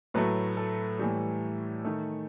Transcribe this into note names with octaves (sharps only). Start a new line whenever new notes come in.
A2 F#3 A3 B4
A4
A2 E3 G3
D#3 A3